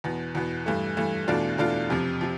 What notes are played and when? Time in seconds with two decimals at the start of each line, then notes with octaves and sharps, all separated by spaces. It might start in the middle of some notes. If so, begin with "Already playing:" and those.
0.04 E2 B2 B3
0.35 E2 B2 B3
0.66 G2 E3 A3
0.97 G2 E3 A3
1.28 E2 B2 A3 D4 F4
1.58 E2 B2 A3 D4 F4
1.90 F2 C3 F3
2.21 C3 F3